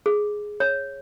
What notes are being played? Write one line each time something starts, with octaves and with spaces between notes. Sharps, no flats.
G#4
C#5